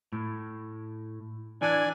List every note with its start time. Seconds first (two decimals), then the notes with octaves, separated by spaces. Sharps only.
0.13 A2
1.62 E3 D4 D5 G#5